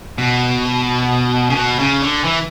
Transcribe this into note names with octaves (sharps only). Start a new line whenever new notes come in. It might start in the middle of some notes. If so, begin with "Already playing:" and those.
B2
C#3
B2
C#3
D3
E3